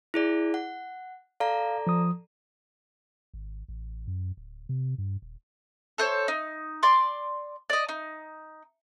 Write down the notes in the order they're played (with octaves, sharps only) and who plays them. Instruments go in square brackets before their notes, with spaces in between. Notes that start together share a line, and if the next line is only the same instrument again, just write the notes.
[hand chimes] E4 G#4 D5
F#5
[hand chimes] A4 D5 A#5 [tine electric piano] F5
[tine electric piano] F3 D#6
[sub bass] G#1
A1
F#2
D1
C3
G2
D#1
[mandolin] A4 C5 C#5
D#4
D5 C6 D6
D5 D#5
D#4